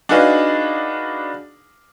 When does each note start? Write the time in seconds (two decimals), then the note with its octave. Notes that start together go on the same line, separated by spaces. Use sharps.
0.09 D4 D#4 F#4 G#4 B4 F5